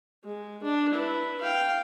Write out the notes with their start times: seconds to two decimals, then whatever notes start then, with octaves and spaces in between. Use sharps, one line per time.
0.25 G#3
0.63 D4
0.94 E4 B4
1.41 F5 G5